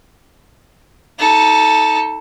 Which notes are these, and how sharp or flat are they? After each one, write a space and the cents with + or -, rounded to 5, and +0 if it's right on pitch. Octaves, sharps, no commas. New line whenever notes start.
D#4 +30 A4 +0